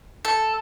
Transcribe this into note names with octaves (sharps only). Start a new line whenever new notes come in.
A4